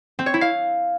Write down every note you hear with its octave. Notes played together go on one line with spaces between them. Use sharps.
C4
C#5
E4
F5